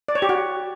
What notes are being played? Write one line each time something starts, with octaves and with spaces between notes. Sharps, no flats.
D5
C#5
G4
F#4